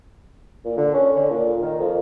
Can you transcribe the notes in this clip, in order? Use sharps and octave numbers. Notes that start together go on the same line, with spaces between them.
A#2
D3
C#4
D3
A#2
D#3
F2